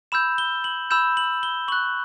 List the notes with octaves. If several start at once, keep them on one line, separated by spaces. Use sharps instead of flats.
B5 E6 G6 E7
G7
F#7
B5 E6 G6 E7
F#7
G7
C#6 F#6 F#7